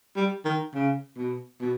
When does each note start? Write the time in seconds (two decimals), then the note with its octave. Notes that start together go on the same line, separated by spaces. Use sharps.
0.16 G3
0.45 D#3
0.74 C#3
1.17 B2
1.61 B2